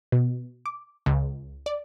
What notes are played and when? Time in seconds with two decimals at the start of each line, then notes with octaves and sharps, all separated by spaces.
0.12 B2
0.66 D6
1.06 C#2
1.66 D5